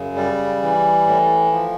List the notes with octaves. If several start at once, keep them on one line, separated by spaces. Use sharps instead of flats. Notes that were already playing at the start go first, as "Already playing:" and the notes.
Already playing: F#2 C#3
G3
E3
A2
F3